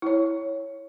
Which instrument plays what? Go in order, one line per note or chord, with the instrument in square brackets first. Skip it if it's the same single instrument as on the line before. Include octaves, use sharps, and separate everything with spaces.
[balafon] E4 C#5